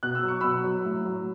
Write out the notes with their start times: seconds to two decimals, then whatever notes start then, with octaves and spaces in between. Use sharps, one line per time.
0.03 B2 F#6
0.15 E6
0.23 F#3
0.28 C#6
0.41 B2 B5 E6
0.64 F#3
0.85 A2
1.05 F#3